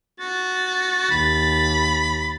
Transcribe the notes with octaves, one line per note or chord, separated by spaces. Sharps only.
F#4 A6
D#2 B5